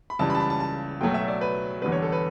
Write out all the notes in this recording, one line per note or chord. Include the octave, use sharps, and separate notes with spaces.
B5
C#2 C#3 E3 G3 A5
B5
A5
B5
A5
A5
B1 B2 F#3 A3 G5
E5
D5
B4
E2 D3 G3 B4
C#5
A4
B4